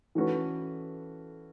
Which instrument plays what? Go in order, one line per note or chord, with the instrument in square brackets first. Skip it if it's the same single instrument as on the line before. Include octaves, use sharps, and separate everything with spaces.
[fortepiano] E3 A3 C#4 F#4 B4